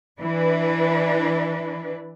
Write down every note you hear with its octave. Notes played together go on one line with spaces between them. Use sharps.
E3 D4 B4